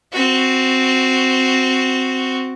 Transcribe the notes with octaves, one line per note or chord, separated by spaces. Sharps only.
C4 F#4